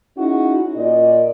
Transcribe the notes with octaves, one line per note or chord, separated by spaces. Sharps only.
C#4 D#4 E4 F#4 G#4
A#2 D5 D#5